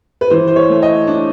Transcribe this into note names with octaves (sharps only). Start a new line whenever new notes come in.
B4
E3 C5
C5
C#5
A3
D#5
D4